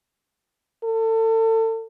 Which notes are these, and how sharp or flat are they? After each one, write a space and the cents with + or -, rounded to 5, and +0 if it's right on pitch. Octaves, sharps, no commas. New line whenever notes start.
A4 +30